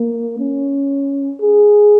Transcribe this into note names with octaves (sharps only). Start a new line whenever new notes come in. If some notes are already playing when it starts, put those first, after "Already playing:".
Already playing: A#3
C#4
G#4